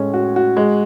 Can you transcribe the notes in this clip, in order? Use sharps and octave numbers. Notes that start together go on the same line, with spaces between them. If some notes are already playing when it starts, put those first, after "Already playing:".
Already playing: A2 G#3 C#4
F#4
F#4
G#3